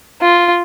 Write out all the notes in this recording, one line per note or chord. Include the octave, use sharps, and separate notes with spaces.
F4